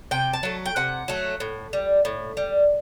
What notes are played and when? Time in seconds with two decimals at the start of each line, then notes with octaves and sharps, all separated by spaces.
0.11 C3 G5
0.33 A5
0.43 F#3 A3
0.66 G5
0.76 C3 F#5
1.08 F#3 A3
1.40 A2
1.73 G3
2.05 A2
2.37 G3